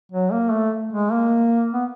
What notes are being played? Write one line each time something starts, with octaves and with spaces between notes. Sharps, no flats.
F#3
A#3
A3
G#3
A#3
B3